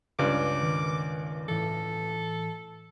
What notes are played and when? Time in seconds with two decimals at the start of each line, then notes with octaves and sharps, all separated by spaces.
0.19 C#2 G2 D6
0.63 D#3
1.48 A2 E3 A4